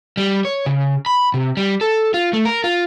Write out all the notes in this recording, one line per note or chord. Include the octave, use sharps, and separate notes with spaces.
G3
C#5
C#3
B5
C3
G3
A4
F4
A3
A#4
F4